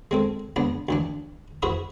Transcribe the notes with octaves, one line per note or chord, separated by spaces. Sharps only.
G#3 C4 A4
C#2 B3 D4
D2 E3 D4
E4 F#4 G#4 B4 C5 E5